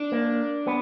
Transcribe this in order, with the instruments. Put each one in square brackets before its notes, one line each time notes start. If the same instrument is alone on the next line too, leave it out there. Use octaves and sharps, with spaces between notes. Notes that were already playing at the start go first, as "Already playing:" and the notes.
Already playing: [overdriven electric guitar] D4
[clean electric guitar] A#3
B3